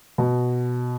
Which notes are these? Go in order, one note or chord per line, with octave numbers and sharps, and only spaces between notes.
B2